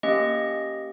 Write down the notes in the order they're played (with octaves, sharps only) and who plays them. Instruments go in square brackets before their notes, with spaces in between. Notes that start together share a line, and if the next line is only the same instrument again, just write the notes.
[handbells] A#3 C#4 G4 D#5